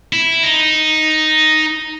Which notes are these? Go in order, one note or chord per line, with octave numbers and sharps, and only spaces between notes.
E4
D#4